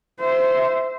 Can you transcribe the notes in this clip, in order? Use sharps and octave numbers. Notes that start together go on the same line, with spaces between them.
C5 E5